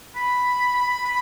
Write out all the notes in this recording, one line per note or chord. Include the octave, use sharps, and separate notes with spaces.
B5
B5
B5
B5